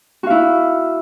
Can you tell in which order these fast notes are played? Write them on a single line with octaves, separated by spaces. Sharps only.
F#4 F5 E4